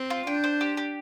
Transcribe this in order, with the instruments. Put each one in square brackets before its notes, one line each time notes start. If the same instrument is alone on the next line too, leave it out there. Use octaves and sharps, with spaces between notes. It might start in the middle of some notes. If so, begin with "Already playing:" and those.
Already playing: [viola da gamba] C4
[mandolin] F4
[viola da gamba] D4 [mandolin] G5
[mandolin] C5
G4
G4